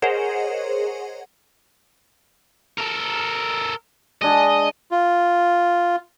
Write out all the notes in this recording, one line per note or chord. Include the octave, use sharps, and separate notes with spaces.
G#4 A#4 C5 C#5 D#5 F#5
A4 A#4
G#3 D4 G#4 D#5
F4